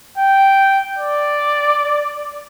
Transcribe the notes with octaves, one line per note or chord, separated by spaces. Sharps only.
G5
D5